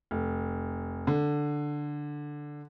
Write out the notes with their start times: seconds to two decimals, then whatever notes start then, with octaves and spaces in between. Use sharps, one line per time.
0.11 F1
1.07 D3